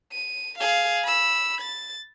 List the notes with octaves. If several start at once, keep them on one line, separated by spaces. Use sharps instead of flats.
D#7
G#4 F5
B5 E6
A6